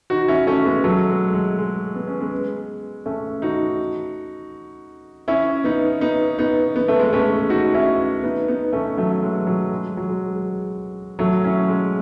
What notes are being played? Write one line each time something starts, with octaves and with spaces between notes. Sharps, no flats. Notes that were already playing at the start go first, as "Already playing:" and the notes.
D#4 F#4
C#4 E4
A3 C#4
G#3 B3
F#3 A3
G#3
G#3
G#3
B3
C#4
G#3 B3
A3 C#4
D#4 F#4
C#4 E4
B3 D#4
B3 D#4
B3 D#4
B3
A3
G#3 B3
A3 C#4
D#4 F#4
C#4 E4
B3 D#4
B3 D#4
A3 C#4
F#3 A3
G#3
F#3
G#3
F#3
G#3
F#3 A3
C#4 E4
G#3